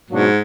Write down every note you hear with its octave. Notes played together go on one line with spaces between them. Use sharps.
G#2 B2 F#3 A#3 D4 F#4